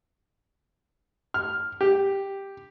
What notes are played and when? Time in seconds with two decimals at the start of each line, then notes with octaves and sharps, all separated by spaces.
1.34 F6
1.81 G4